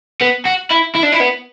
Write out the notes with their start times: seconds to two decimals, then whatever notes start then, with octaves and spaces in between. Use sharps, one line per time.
0.21 B3
0.46 F#4
0.71 E4
0.95 E4
1.03 D4
1.12 E4
1.20 B3